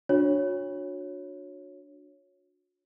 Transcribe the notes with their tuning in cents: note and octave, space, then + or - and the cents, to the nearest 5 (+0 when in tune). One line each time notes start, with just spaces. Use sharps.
D4 +0 F#4 -35 C#5 +0